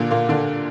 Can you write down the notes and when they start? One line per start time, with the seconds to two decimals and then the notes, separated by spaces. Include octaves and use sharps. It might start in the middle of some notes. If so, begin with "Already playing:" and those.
Already playing: A#2 D3 A#3 D4
0.11 A#2 A#3
0.29 D3 D4